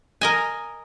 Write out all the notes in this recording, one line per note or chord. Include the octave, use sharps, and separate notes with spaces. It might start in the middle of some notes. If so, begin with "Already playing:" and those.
A#4 D#5 G#5